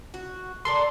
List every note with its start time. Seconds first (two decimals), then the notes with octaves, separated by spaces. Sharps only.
0.14 F#4
0.65 A4 A#4 D5 C6